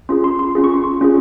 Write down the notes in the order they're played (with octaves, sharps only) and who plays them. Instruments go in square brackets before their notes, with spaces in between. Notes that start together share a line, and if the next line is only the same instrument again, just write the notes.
[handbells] C#4 F4 G#4 C6
C6
C6
C#4 F4 G#4
C#6
C6
C#6
C#4 F4 G#4